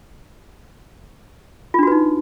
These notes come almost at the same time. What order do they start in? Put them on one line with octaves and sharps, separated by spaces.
F4 D4 F#4 B4 D#4